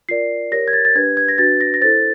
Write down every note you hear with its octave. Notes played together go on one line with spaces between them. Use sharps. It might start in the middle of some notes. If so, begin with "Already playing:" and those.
F4 A#4 D5 C7
G4 A#4 C#5 A#6
G#6
A6
A6
D4 G4 B4 G#6
G#6
A#6
D4 F#4 B4 A6
A#6
A#6
E4 A4 C5 A6